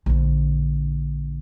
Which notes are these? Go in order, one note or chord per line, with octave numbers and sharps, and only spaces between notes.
A#1 D3